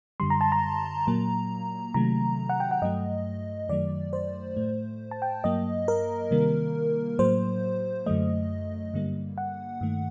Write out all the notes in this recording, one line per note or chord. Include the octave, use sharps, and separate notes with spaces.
F#2 D3 G3 C6
A#5
A5
A#5
A#2 F#3 A#3
C3 D#3 F#3 A3 A#5
F#5
G5
F#5
G2 F#3 A3 D#5
F#2 D#3 F#3 A3 D5
C5
A2 A3
A5
G5
G2 F#3 A#3 D#5
A#4
C3 D#3 G3 A#3
A2 F#3 A#3 C5
F#2 D3 F#3 A3 D#5
G2 D3 G3 A#3
F#5
G2 D#3 A3